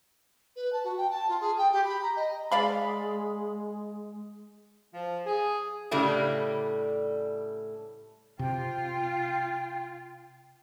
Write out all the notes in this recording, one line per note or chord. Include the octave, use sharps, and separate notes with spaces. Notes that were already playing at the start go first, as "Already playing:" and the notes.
B4
A5
F#4
G5
A5
F4
G#4
G5
G4
B5
A#5
D#5
G#3 D5 F5 B5
F3
G#4
A2 C#3 G3 A3 D4
C3 F4 G5